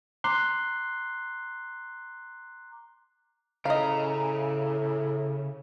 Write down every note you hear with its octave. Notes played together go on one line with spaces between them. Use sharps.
A#5 C6 D6 F#6 C7 G7
A2 C#3 D#5 F5 A#5